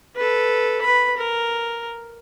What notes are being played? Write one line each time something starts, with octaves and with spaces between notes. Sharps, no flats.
A4 B4
B4 B5
A#4